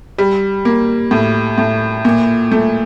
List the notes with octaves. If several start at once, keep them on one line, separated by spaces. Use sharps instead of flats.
G3
A#3
A2
A2
A#2
A3